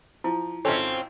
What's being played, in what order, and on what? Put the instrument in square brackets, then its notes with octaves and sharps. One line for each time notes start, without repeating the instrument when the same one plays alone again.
[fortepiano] F3 [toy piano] E4
[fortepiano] G#1 A4 [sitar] C4 C#4 F4